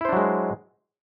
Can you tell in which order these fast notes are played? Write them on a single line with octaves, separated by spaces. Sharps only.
E4 C5 D4 F#3 G#3